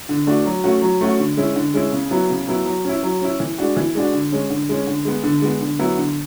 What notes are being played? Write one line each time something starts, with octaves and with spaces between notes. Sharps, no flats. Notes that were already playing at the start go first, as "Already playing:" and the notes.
D3
A3 D4 F#4
F#3
A3 C#4 F#4
F#3
A3 C#4 F#4
D3
G#3 C#4 E4
D3
G#3 C#4 E4
C#3
F#3 B3 E4
C#3
F#3 B3 E4
F#3
C#4 E4
F#3
C#4 E4
E3
G#3 D4 F#4
E3
G#3 D4 F#4
D3
G#3 C#4
D3
G#3 C#4
D3
G#3 B3
D3
G#3 B3
D3
F#3 B3 E4
D3